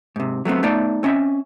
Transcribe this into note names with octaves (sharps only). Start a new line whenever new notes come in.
G#2 C3
F#3 A3 B3 C4
A3 B3 D#4 C#5 D5 E5
C4 C#4 D#5 E5